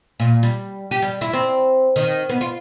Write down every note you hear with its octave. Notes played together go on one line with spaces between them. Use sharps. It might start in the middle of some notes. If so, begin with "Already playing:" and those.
A#2
G3
G4
G3
E4
C4
D#3
B3
F4